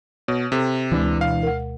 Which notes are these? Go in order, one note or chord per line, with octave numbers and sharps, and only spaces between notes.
B2 C#5
C3 A4
D2 E3 G#3 D4
B2 F5
A#4 F#5